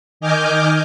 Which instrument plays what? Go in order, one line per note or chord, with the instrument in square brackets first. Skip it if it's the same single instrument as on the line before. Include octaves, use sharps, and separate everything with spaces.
[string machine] D#3 D#5 G#5 D6 F6 G6